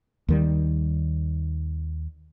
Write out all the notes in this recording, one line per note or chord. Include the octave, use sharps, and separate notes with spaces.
D#2 D#3 G3